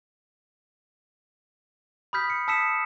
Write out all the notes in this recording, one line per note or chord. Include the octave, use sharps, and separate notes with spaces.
B5 D#6 F6 G6 B6
C#7
A5 D#6 E6 B6 C#7 E7